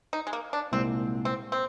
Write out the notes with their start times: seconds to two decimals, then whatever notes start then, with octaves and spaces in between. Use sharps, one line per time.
0.13 D#4
0.27 G#3
0.33 A#3
0.53 D4
0.72 C2 A#2 G#3 C4
1.25 C4
1.52 C4